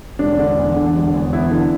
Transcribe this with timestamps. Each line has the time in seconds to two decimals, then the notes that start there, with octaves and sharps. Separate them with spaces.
0.19 E1 D4
0.38 D3
0.57 E2
0.76 D3
0.95 E1
1.14 E2
1.33 B3 E4
1.51 D3